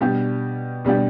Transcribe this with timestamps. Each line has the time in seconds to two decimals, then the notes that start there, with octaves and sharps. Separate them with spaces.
0.01 B2 G3 D4 G4
0.85 B2 G3 D4 G4